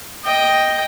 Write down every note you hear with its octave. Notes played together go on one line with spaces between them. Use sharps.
D#5 G5